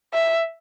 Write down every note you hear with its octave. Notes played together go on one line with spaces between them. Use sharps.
E5